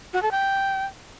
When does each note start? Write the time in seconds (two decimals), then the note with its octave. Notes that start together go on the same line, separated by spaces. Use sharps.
0.14 F#4
0.22 A4
0.31 G5